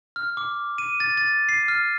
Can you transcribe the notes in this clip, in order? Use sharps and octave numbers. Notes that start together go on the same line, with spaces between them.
F6
D6
D#7
A6
A6
C7
F6